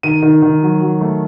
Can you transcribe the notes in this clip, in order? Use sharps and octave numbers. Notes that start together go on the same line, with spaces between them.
D#3 D#7
D#3
D#3
F#3
F#3
A3